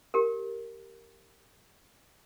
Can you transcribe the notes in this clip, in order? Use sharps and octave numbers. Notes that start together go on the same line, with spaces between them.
G4 A#4